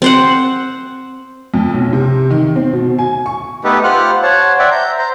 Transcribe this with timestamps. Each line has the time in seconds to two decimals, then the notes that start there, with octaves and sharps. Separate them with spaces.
0.02 C4 C5 F#5
1.54 F2
1.74 B1
1.93 C3
2.30 D#3
2.56 C4
2.73 B2
2.99 G#5
3.26 C#6
3.64 A3 B3 D#4 G4 A4 B4
3.84 F4 G4 C5 F#5 F6 F#6
4.23 C5 C#5 F#5 A5
4.59 C5 D5 E5 F#5 G5
4.71 A#5 G6
4.98 C5 A#5